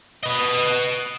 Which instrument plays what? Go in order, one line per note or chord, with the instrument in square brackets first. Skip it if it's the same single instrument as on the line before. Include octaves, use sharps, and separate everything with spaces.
[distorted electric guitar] B4 D#5